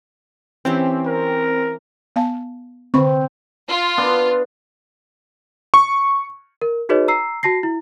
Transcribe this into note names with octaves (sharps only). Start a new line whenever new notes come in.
E3 C4 C#4 G4
A#4
B3 F5 A5
D3 C4 B5 C#6
F4
B3 D4
C#6
A#4
D#4 F#4 G#4 B4 C#5 D#5
A#5 E6 C7
F#4 A5 A#6 C7
E4